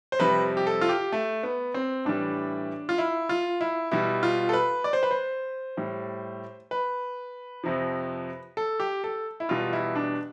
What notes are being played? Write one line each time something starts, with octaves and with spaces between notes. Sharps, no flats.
C5
F2 C3 G3 B4
G4
A4
F4
G4
A3
B3
C4
A2 E3 G3 D4
F4
E4
F4
E4
B2 G3 E4
F4
A4
B4
D5
C5
B4
C5
A2 G3
B4
F2 C3 F3
A4
G4
A4
E4
E2 B2 G3 F4
E4
D4